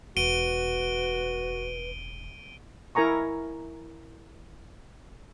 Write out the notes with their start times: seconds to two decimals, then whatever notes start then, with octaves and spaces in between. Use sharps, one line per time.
0.17 E1 F#4 B4 D7 D#7 G7
2.95 E4 A#4 G#5 A#5 C#6